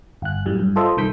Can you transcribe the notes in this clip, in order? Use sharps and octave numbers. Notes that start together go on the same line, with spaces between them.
G1 F#6
F#2 A2 G3
G2
F4 A4 C5 D#5 E5
C2 D#3 G6 B6